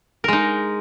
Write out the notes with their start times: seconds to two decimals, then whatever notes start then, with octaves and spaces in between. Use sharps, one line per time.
0.24 A#4
0.28 G#3
0.33 D#4